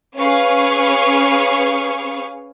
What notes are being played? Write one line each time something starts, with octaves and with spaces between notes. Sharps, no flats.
C#4 G#4 B4 F5 C#6 F6